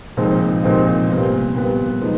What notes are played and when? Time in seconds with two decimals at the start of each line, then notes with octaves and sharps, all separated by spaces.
0.17 A#2 F3 G#3 C4 D#4
0.63 A#2 F3 G#3 C4 D#4
1.10 A#2 G3 B3
1.55 A#2 G3 B3
2.01 F3 G#3 B3 D#4